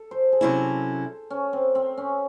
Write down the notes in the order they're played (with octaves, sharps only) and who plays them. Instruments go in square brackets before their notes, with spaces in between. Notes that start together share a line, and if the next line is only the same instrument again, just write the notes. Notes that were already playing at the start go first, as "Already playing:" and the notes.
Already playing: [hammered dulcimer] A4
C5
G#4
[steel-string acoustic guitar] C3 F#3 C#4 E4 [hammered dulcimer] A4
[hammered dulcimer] C#4
C4
C4
C#4